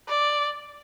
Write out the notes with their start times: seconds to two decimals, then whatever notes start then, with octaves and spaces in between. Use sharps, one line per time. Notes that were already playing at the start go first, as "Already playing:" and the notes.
0.08 D5